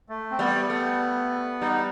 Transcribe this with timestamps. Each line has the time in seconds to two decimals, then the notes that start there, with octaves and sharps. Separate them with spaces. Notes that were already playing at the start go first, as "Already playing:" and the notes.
0.09 A3
0.31 C4
0.39 G3 B3
0.70 A3
1.61 G3 D#4